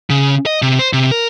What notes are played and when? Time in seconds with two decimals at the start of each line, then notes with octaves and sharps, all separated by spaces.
0.10 C#3
0.46 D#5
0.62 C3
0.79 C5
0.93 C3
1.11 A#4